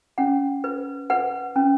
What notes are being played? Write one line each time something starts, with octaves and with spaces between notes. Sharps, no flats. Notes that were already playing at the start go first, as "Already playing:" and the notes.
C#4 F#5
B4
B4 F#5
C#4